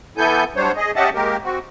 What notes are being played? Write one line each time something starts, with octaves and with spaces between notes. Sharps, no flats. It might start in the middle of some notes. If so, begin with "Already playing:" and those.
E3 B3 E4 A4 G#5 G6
F#3 G3 D4 C5 C#5
G#4 D#5
C#4 G4 D#5 E5 F#5 A5
G#3 A#3 G4 A#4
C4 F#4